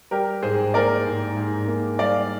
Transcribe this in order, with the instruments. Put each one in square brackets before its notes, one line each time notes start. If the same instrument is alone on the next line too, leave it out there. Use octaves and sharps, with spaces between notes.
[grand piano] G3 G4 A#4
G#2 G#4 C5
A#3 A#4 D5
G#2
G#2
A#3
G3 D5 F5